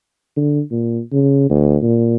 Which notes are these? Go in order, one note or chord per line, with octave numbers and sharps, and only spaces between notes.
D3
A#2
C#3
D2
A#2